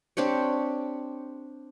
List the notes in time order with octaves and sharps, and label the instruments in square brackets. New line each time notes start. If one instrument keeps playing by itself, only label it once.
[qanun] C4 D4 G4 C#5